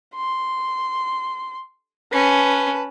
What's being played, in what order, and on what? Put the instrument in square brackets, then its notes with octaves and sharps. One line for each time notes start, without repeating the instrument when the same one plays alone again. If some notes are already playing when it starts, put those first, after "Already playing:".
[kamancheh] C6
[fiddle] C#4 [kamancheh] B4 A5